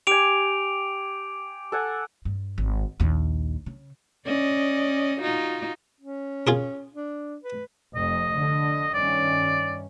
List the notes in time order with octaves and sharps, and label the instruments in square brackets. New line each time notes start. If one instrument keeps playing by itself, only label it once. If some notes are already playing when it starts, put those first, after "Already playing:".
[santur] G4 G#5 [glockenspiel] D6 D7 F7
[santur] A4 F#5 G#5
[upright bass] G2
G#1
A#1 D#2
C#3
[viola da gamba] C#4 D5 D#5
D#4 F4 F#4
[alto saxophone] C#4
[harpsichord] F4 G#4 A#4
[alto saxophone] D4
B4
[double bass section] F1 F2 [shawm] D#5
[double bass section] D3
[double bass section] G2 D#3 C#4 [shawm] D5